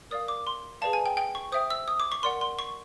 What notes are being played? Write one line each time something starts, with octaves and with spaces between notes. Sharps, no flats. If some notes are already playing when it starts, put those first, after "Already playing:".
A#4 D5 F5 D#6
D6
C6
G#4 B4 D5 F5 A5
G#5
G5
G5
C#6
C5 E5 G5 D#6
E6
D#6
D6
C#6
A#4 D5 F#5 C6
C6
C#6